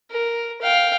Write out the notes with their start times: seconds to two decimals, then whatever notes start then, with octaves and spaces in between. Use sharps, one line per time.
0.11 A#4
0.62 F5 G5